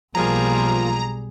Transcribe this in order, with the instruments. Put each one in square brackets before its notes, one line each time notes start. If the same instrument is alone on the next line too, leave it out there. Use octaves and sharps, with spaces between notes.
[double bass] B1 [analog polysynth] F3 A#3 F4 [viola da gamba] G3 G#4 [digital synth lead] A#5